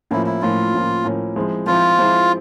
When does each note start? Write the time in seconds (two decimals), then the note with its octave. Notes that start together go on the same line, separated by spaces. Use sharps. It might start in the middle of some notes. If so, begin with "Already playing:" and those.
0.11 A2 F3 A#3 C#4 E4
0.26 E4
0.42 A2 F3 A#3 C#4 F4
0.74 A2 F3 A#3 C#4
1.05 A2 F3 A#3 C#4
1.36 F3 G#3 C4 E4
1.66 F3 G#3 C4 E4 F4
1.99 F3 G#3 C4 E4